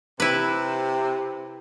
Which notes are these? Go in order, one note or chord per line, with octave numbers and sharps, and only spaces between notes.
C3 E4 B4